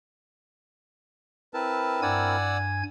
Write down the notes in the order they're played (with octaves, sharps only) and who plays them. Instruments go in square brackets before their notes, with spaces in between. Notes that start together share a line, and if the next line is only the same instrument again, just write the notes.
[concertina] C4 E4 A#4 [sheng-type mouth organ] B4 A5
[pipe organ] G2 G#5 G#6 [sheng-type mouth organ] D5 F#5 E6